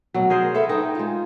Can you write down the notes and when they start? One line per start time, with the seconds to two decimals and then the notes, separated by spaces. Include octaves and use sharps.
0.14 D2 B2 F#3
0.30 G#4 A#4 C5
0.55 A4 B4 E5
0.69 D#4 G5
0.95 G#3 F4